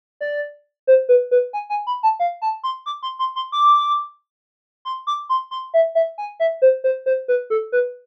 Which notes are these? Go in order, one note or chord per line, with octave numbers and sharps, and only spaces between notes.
D5
C5
B4
B4
G#5
G#5
B5
A5
F5
A5
C6
D6
C6
C6
C6
D6
C6
D6
C6
C6
E5
E5
G#5
E5
C5
C5
C5
B4
A4
B4